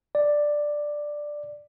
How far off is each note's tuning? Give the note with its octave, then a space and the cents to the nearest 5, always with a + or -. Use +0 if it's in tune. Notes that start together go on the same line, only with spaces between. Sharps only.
D5 +5